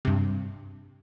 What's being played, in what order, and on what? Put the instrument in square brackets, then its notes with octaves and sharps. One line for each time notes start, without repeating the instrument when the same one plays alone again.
[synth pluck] G2 C3